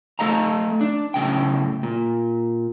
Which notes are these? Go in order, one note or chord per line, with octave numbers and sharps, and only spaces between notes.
A3 A4 D#5 F5 A#5
D4
F#2 A2 C#3 G5
A#2